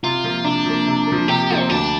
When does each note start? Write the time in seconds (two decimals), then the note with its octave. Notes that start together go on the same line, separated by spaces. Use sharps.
0.03 C3 F4
0.24 F3 A#3
0.45 C3 D4
0.66 F3 A#3
0.86 C3
1.06 A#3
1.12 F3
1.28 C3 G4
1.49 F3 A#3
1.58 C4
1.69 D2 D4